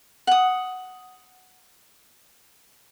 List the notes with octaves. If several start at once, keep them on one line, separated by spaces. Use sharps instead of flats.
F#5 D#6